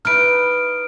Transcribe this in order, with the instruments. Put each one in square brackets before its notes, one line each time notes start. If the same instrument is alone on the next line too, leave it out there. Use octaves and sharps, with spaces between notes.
[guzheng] D#4 E4 B4 [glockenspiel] F6 D7